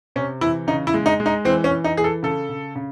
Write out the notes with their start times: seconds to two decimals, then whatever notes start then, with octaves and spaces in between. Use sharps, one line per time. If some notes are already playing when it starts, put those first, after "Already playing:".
0.16 C3 C#4
0.41 E3 E4
0.67 C#3 D#4
0.87 E4
0.94 G#3
1.06 D#4
1.20 G#3
1.26 D#4
1.45 E3 C4
1.64 C#4
1.71 E3
1.84 D#4
1.97 E3 G#4
2.04 A4
2.23 C#3 A4
2.49 C#3
2.76 C#3